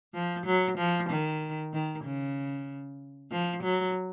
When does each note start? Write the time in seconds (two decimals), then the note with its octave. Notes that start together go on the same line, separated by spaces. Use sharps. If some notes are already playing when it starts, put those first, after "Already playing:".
0.14 F3
0.46 F#3
0.78 F3
1.10 D#3
1.73 D#3
2.05 C#3
3.31 F3
3.63 F#3